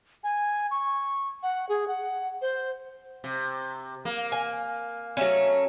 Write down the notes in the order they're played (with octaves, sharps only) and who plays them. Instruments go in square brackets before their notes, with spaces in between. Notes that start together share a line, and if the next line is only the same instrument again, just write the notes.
[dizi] G#5
C#6
F#5
G#4
F#5
C5
[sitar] C3
A#3
[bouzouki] G#5
F#3 A3 C#4